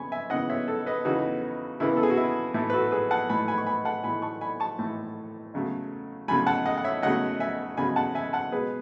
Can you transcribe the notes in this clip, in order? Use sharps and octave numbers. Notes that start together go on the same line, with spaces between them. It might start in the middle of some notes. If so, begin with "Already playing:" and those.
Already playing: E2 C#3 B3 G#5 B5 C#6
E5 G#5
E2 C#3 E3 B3 D#5 F#5
C#5 E5
A4 C#5
B4 D#5
E2 C#3 E3 B3 D#4 F#4
E2 C#3 E3 B3 E4
A4
G#4
F#4
E4
A2 E3 A3 E4
B4
F#4 A4
G#4 B4
F#5 A5
A2 E3 A3 G#5 B5
G#5 B5
C#6
G#5 B5
F#5 A5
A2 E3 A3 G#5 B5
A5 C#6
G#5 B5
A5 C#6
A2 E3 A3
E2 C#3 F#3 A3
E2 C#3 F#3 A3 G#5 B5
F#5 A5
D#5 F#5
F#5
C#5 E5
E2 C#3 F#3 A3 D#5 F#5
E5 G#5
E2 C#3 F#3 A3 G#5 B5
F#5 A5
E5 G#5
F#5 A5
B2 G#3 B3 G#4 B4